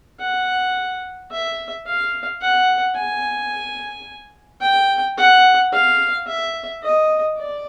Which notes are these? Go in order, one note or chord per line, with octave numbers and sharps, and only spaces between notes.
F#5
E5
F5
F#5
G#5
G5
F#5
F5
E5
D#5
D5